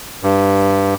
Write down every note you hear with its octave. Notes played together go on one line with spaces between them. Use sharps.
G2